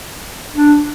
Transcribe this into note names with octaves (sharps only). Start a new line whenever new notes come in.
D4